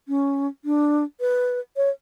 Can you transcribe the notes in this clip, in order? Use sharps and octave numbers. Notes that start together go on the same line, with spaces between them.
C#4
D4
B4
C#5